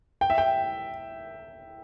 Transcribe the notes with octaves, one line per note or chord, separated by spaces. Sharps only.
G5
E5
G5